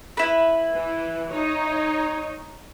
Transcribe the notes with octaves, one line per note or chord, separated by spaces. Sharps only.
E4 B4
E3
D#4 C#5